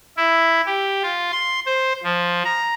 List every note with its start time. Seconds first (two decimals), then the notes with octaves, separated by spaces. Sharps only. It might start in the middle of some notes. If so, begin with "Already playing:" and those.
0.17 E4
0.66 G4
1.03 F4
1.32 C6
1.66 C5
2.04 F3
2.45 A#5